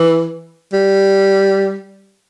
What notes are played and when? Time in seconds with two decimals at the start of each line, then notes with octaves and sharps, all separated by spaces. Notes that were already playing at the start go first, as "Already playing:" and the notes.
Already playing: E3
0.73 G3